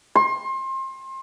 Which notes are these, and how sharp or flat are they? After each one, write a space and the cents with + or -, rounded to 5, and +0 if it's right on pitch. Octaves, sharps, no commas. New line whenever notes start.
C6 +30